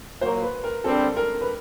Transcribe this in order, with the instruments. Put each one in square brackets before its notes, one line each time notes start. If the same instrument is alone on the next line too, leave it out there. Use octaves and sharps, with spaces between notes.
[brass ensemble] A#2 F#3 A#3 [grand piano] C5
[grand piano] B4
A#4
[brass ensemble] D3 G3 C4 [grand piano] A4
[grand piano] A#4
B4